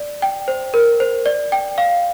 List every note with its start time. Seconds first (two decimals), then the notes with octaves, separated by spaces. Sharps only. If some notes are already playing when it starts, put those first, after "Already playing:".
Already playing: D5
0.22 G5
0.48 C5
0.74 A#4
1.00 C5
1.26 D5
1.52 G5
1.78 F5